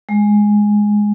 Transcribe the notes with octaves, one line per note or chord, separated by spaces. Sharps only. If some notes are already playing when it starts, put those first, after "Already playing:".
G#3